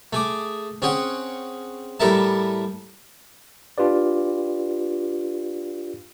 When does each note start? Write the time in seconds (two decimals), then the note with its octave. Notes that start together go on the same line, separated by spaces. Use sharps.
0.13 A3 G#4 D6
0.82 C4 C#4 G#4 F#5 G5
2.00 A2 G3 A4 A#4 E5 A5
3.78 D4 F4 G4 B4 D5